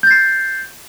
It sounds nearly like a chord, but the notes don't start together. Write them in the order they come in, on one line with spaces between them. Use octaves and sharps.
G6 A6 C7